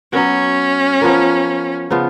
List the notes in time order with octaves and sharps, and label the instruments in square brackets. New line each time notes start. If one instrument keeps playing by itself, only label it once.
[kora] F#3 B3 F#4 [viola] C#4
[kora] F3 B3 F4 A#4
C#3 F3 B3 F4